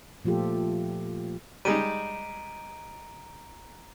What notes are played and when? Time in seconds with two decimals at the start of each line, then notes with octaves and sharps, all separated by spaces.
0.25 A#2 F3 A3 F4 G4 A4
1.65 G3 G#3 D#4 A#5 D7 D#7